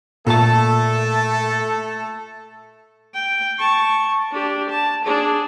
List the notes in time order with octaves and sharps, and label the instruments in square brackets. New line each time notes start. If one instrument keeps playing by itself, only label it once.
[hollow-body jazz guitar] A#2 A5 [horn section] A3 A4
[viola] G5
A5 C#6
D4 G4
A5
D4 G#4